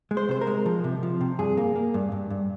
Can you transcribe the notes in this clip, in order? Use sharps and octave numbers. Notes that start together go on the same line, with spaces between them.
G#3
C5
C3 C5
A#4
G#3
F3
C3
F3
C3
G2 G#4
A#3
A#3
G2
G2
G2